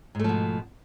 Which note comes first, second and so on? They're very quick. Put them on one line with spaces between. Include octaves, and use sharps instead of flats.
G#2 A3 F3 B2